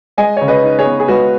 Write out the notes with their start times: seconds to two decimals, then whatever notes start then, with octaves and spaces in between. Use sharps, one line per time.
0.18 G#3 D#5 G#5
0.37 C#3 C#5
0.48 B4 D#5
0.63 D#4
0.79 G#4 C#5
0.86 B3
1.00 G#4
1.08 G#3 F#4 B4